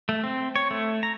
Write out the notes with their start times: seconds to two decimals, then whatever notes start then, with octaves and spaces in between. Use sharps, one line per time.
0.09 A3
0.24 C4
0.56 C#5
0.71 A3
1.03 A#5